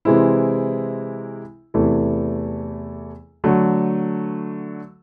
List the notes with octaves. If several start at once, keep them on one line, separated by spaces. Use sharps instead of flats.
C3 E3 G#3 C4 E4
E2 C3 E3 A3
D3 F#3 A3